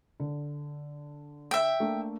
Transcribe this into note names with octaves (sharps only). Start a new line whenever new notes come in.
D3
E5 G5
A3 A#3 D4